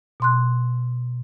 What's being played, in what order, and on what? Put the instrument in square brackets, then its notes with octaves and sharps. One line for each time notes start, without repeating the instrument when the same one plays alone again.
[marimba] B2 C6 F#6